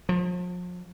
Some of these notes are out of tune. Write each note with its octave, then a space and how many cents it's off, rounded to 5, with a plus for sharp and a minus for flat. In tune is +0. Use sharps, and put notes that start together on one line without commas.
F3 +40